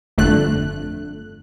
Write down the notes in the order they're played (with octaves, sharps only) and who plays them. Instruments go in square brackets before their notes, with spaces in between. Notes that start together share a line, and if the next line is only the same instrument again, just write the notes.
[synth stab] G1 F2 D3 A3 F#6